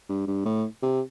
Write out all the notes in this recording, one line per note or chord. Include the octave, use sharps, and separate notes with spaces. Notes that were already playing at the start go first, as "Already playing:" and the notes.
G2
G2
A2
C3